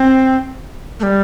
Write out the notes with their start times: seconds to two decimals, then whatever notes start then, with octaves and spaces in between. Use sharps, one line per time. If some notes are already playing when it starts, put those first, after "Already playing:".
Already playing: C4
1.00 A3
1.03 G3